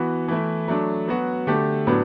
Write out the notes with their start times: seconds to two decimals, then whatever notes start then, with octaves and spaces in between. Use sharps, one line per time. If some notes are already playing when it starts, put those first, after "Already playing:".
Already playing: E3 B3 F#4
0.28 E3 A3 E4
0.68 F#3 A3 D4
1.08 F#3 B3 F#4
1.47 D3 A3 D4 G4
1.87 A2 F#3 B3 D4